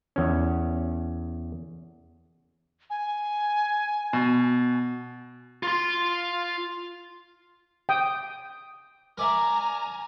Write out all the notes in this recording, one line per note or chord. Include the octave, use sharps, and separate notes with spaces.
E2 C#4
G#5
B2
F4 C6
G5 D#6
A#4 D5 E5 G#5 A#5